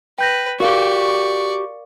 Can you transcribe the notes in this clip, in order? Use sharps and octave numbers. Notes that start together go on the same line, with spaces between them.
B4 G5 G6 A#6
F#4 G4 A#4 D5 F5 C#6